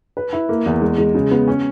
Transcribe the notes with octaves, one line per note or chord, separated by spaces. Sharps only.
B4
E4
A#3
E2
G#3
G#3
C#3
B3
C#4